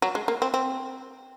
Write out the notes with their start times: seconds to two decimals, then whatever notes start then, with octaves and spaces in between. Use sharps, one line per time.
0.02 F#3
0.15 G#3
0.28 A#3
0.42 C4
0.54 C4